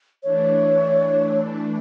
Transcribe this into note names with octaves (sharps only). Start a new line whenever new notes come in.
E3 A3 D4 C#5